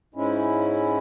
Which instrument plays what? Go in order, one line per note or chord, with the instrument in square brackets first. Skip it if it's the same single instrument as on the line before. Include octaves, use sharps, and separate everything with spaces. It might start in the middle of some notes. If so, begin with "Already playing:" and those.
[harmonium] G#2 G#3 C#4 E4